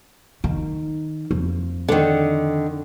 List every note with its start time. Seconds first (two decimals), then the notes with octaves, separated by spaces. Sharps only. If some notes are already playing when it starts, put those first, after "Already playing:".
0.44 D#3
1.31 F2
1.88 D3 D#3